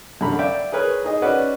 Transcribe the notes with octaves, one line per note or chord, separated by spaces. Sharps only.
F#2 D3 A#5 B5
D5 E5 F5 G5
G#4 A#4 B4 C#5
D#4 G#4 D#5
C#4 F#4 B4 D5 D#5 F#5